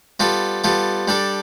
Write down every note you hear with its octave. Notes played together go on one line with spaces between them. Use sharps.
G3 B3 F4 A4
G3 B3 F4 A4
G3 D4 A4